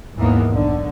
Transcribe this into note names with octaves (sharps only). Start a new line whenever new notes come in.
G#1 D#2 E3 G#3 A#3 B3
B1 D3